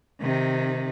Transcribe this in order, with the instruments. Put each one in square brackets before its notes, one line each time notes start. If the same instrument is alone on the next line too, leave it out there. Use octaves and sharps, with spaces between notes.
[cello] C3 D#3